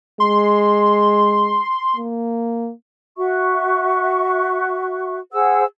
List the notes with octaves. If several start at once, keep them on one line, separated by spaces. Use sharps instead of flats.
G#3 C6
A#3
F#4 E5 C#6
G#4 C5 F#5 E6